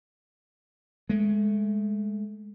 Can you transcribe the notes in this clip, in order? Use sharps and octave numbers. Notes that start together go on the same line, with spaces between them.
G#3 A3